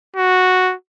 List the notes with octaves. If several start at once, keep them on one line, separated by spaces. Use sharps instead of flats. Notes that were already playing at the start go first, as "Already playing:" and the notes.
F#4